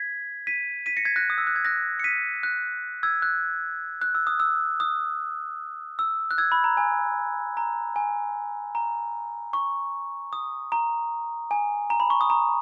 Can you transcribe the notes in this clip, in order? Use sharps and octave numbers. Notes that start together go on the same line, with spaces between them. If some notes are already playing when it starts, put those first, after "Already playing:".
Already playing: G#6 B6
B6 D#7
B6 D#7
A#6 C#7
G#6 B6
F#6 A#6
D#6
E6
F#6
G#6
F#6 A#6
C#7
B6 D#7
F#6
E6 G#6
F#6
F#6
E6
D#6
E6
D#6
E6
F#6
E6 G#6
B5
A#5
G#5
A#5
G#5
A#5
C#6
D#6
A#5
G#5
A#5
B5
C#6
D#6
A#5